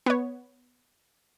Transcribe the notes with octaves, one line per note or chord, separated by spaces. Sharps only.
B3 C#5